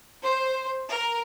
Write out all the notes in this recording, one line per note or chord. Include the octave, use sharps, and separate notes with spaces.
C5
A#4